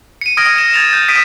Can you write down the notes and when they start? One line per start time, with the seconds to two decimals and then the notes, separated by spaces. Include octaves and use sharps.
0.21 C#7 D#7
0.37 D#6 F6 G#6 A#6 D7
0.57 A#6 E7
0.74 G#6 A6 F7
0.93 G6
1.09 D#6 B6 D7 D#7